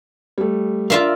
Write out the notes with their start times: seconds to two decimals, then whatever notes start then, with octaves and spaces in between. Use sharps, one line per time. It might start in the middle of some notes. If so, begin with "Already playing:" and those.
0.38 G3 A3
0.90 F4 A#4 D5 E5 F5